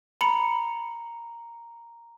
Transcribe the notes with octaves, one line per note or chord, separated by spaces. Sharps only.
A#5 B5 C#7